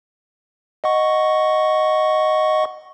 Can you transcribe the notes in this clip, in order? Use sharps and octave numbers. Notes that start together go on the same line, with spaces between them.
D#5 F#5 C#6